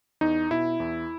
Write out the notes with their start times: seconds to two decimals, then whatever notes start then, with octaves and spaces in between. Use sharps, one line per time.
0.21 E2 D#4
0.51 B2 E4
0.80 E2